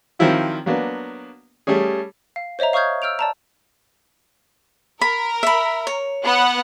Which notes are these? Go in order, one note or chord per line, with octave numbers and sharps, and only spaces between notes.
D#3 F3 F#3 C4 E4 F4
F#3 A#3 B3 D4 F#4
G3 A3 C#4 G#4
F5
C5 C#5 D#5 E5 A#5
F5 C#6 D#6 F6 G6 G#6
E6 F6 G6 D7 F7
D5 A5 A#5
A#4 B5
E5 B5
C#5
B3 F#5